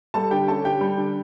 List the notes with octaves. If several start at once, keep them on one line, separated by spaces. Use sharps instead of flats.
G3 A4 A5
D3 G4 G5
C#4 A4 A5
D3 G4 G5
G3
D3